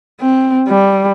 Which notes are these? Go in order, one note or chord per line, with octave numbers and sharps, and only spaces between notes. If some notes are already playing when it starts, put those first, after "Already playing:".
C4
G3